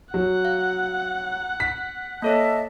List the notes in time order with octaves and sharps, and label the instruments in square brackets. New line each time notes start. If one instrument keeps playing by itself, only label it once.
[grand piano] F#3 [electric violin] F#5
[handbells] F5
[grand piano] B6
[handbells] A#3 A4 C#5 [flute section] D#5 E5 A5